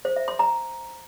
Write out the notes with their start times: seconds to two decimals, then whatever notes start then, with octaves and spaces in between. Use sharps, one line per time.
0.05 C5
0.16 E5
0.28 C6
0.39 A#5